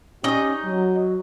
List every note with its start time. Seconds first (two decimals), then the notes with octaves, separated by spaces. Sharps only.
0.24 C#4 D#4 G4 D#5
0.65 F#3